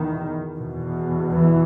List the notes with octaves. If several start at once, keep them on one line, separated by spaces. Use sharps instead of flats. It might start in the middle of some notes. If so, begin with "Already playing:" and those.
Already playing: E2 B2 D#3
E2 B2
E3